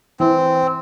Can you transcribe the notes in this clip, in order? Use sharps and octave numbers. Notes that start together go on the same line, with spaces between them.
E3 C4